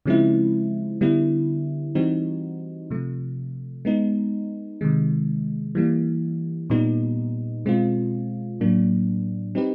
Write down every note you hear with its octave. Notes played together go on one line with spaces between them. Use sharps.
C#3 F3 G#3 C4 E4
D3 G3 B3 E4
E3 G3 C4 D#4 F#4
C3 F3 A3
G#3 B3 D#4
C3 D#3 G#3
E3 G3 A#3
A#2 G3 B3 D#4
B2 G#3 C4 F4
A2 F#3 A#3 D4
G3 C4 D#4 G4 B4